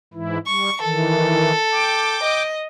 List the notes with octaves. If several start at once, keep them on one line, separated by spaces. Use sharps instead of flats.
G#2 E3 E4
G3 C#6
D#3 E3 A4
G5 D6
D#5